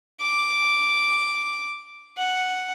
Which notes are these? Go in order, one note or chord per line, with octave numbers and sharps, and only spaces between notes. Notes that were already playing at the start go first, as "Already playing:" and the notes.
D6
F#5